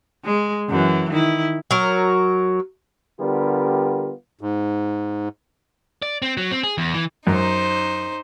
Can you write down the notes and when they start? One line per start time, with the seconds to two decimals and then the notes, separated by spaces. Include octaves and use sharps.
0.25 G#3
0.69 F#2 E3
1.12 D#3 E4
1.71 F#3 A#4
3.20 D3 G3 B3 F4 G4 A#4
4.41 G#2
6.02 D5
6.22 C4
6.37 F#3
6.51 C4
6.64 G#4
6.78 E2
6.94 E3
7.27 F#2 D#4 C5